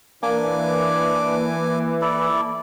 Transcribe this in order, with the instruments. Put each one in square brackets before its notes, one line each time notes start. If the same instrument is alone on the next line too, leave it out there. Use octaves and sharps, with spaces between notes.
[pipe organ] E3 [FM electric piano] A#3 [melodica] D4 [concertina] G#5 D6
[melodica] E4 A4 D5